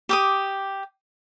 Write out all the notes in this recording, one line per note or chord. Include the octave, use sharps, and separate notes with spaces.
G4 D6 D#6